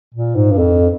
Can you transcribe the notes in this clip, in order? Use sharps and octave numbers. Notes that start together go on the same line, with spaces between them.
A#2
G#2
G2
F2